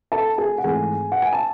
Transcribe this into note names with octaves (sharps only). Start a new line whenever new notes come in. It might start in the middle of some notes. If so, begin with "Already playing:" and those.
A4 A5
G#4 G#5
F#5
G#1 G#2 E3 A3 G#4 G#5
F#5
G#5
A5